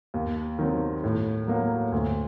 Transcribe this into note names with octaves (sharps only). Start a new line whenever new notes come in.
D#2
D#3 F#3 C4
A2
F#3 A#3 F#4
D2